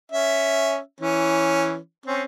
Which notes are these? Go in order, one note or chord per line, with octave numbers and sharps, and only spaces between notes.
C#4 E5
E3 C#4
C4 C#4